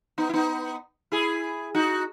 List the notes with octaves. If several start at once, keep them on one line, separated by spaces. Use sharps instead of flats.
B3 D#4
E4
B3 D#4
E4 G#4
D#4 F#4